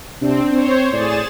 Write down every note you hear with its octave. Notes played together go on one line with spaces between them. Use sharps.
C3 C4 D4
C4 C5 C#5
A2 G#4 D5 A6 E7